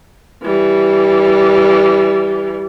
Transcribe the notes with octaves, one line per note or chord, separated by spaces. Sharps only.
E3 G3